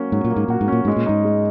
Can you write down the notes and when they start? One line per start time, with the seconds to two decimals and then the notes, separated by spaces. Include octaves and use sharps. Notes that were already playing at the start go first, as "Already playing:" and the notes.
Already playing: F#3 A#3 C#4 F#4
0.12 G#2 F#3
0.24 A#2
0.31 A#3
0.36 G#2
0.48 A#2 F#4
0.61 G#2
0.68 A#2 C#4
0.85 G#2 G#3
0.97 A#2
1.06 G#2 D#4
1.25 G#3